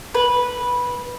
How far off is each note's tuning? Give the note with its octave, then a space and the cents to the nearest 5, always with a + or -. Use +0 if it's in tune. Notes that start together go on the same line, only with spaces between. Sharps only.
B4 -10